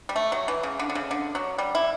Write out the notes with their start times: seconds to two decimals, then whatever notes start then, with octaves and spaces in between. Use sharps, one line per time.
0.09 G3
0.16 A3
0.32 F#3
0.48 E3
0.63 C#3
0.79 D3
0.90 D3
0.95 C#3
1.11 D3
1.35 F#3
1.58 G3
1.75 E4